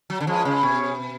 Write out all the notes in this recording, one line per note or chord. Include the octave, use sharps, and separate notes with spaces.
F#3
D3
F3 G#3 C#4 F4 G#4 B4
C#3
B2 C#4 G#4 C#5